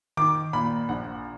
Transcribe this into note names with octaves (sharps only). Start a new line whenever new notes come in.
D#3 D6
A#2 B5
A#1 F#5